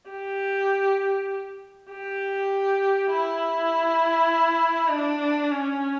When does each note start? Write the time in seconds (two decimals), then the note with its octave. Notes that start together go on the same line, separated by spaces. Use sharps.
0.10 G4
1.91 G4
3.11 E4
4.90 D4
5.51 C#4